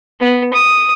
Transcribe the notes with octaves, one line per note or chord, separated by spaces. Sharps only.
B3
D#6